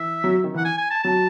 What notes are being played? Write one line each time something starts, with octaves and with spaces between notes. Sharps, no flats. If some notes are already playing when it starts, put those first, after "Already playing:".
Already playing: E3 E5
F#3
D#3
E3 F#5
G#5
G#5
A5
F#3 A5